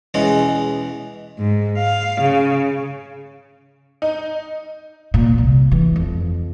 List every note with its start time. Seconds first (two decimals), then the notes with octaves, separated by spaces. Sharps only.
0.14 E2 B2 G#3 C#4
1.39 G#2
1.78 F5
2.21 C#3
4.02 D#4
5.14 A#2
5.38 C2
5.72 E3
5.96 F2